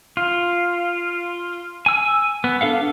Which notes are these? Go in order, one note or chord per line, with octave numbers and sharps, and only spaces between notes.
F4
G#5 E6
B3
D4 A4 F5 F#5